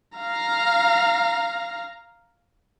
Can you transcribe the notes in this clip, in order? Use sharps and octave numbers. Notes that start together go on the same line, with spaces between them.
F5 A#5